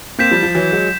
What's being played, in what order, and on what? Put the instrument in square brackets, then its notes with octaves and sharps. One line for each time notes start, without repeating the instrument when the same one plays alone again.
[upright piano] A#3 C4 [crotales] G6 B6 E7
[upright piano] F3 G3
F3
E3 F#3
F#3 G#3